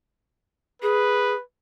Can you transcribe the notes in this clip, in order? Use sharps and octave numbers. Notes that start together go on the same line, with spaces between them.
G#4 B4